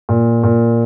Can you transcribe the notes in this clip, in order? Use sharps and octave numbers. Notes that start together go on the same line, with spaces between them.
A#2
A#2